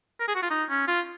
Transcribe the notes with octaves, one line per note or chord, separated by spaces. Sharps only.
A#4
G#4
F#4
F4
D#4
C#4
F4